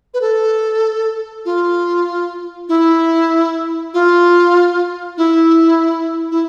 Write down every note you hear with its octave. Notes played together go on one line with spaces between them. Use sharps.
B4
A4
F4
E4
F4
E4
E4